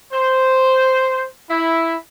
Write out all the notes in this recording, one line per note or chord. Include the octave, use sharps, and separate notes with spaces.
C5
E4